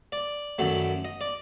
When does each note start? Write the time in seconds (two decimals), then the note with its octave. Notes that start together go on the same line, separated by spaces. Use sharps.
0.12 D5
0.58 F#2 D#3 F#3 A3
1.05 D#5
1.21 D5